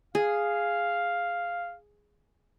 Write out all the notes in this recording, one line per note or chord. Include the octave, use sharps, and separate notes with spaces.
G#4 F5